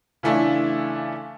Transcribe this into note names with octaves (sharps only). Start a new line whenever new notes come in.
C#3 E3 A3 D4 E4 F4